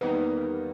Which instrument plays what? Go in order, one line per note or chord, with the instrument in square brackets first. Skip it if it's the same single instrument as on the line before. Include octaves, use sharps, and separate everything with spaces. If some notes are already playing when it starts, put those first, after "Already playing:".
[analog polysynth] E2 D#3 G3 A#3 [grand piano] B3 D#4